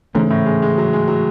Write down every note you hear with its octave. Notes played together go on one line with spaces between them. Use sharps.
G#2 C#3 E3 A3 C#4
A2
G#3
G#3
F#3
G#3
F#3